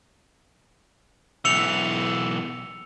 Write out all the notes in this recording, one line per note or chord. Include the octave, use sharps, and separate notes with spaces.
B1 E3 E6 C#7 F7